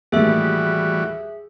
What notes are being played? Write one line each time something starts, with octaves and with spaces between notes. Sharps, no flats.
D#2 A2 E3 G3 F#4 G#4 E5